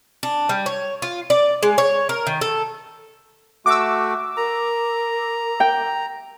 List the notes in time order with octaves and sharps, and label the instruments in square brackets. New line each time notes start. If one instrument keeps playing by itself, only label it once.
[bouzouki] D4
G3
C#5
F4
D5
G#3
C#5
A#4
D#3
A4
[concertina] A3 F#4 [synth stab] D6 E6
[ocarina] A#4 [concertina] A#5
[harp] G5